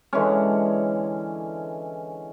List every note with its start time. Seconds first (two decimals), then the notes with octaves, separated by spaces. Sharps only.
0.13 D3 E3 G#3 C#4